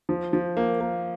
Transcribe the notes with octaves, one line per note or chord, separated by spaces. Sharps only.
F3
F3
A#3
A#3